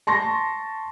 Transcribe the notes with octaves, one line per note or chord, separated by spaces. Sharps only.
A5 C6 C#6 A#6